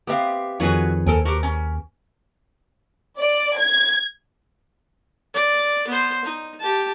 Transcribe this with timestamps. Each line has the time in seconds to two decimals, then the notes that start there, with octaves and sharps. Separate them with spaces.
0.07 B3 C4 G4 E5 F5
0.60 F2 D#3 F#3 F#4 G#4 B4 C#5
1.06 D#2 A4 A#4 C5 G#5
1.25 F#4 G4 A#4
1.43 C#4
3.19 D5
3.56 G#6
5.34 D5
5.87 B3 C5
6.25 D#4
6.60 G4 A5